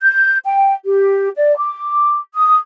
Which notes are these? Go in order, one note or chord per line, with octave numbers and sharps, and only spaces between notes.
G6
G5
G4
D5
D6
D#6